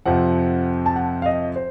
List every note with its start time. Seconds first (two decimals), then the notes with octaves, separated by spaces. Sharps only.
0.06 F2 C3 F3 C4 F#5
0.86 A5
0.96 F#5
1.22 F5
1.26 D#5
1.56 C5